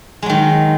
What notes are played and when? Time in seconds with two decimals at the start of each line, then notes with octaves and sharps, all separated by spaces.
0.22 G#3
0.26 F#3
0.30 D#3